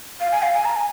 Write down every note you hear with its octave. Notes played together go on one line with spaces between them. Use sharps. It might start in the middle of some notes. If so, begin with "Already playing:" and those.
F5
G#5
F5
G#5
A#5
G#5